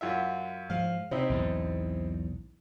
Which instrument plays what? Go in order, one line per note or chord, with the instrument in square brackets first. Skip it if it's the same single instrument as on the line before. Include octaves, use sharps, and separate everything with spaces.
[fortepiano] F#2 F4 E5
[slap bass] G#2 F3 [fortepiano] F5
[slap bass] C3 [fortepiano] C4 D#4 E4
[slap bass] B1 E2 G#2